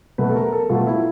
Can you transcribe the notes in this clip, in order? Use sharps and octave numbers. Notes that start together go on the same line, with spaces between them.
B2 F#3 A3 B4
A4
A#4
A4
B2 F#3 A3 F4
E4